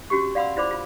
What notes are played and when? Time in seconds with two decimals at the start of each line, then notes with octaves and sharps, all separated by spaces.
0.10 C#4 F#4 G4 C#6
0.35 D5 F5 F#5 B5 C6 E6
0.56 E4 F4 C5 D5 B5 D6
0.71 F4